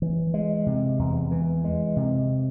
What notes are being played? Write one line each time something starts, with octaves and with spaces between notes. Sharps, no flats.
E3
G#3
C3
E2
E3
G#3
C3